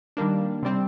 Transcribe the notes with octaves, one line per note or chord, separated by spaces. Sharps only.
D#3 G3 A#3 D4
C3 G3 C4